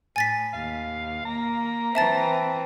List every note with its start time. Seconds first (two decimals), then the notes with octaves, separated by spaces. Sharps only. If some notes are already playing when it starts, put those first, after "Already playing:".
0.16 A2 G#5 A6 B6
0.53 D#2 F5
1.25 A#3 A#5
1.95 E3 C4 E5 A5 A6